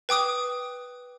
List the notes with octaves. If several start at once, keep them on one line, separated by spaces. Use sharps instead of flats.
B4 G5 D6 D#6